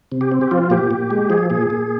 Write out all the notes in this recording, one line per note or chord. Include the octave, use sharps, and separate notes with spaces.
C3
G4
C4
G4
F3 F4
A#2 G4
A#2
G#3
F3 G#4
A#2 G#4
A#2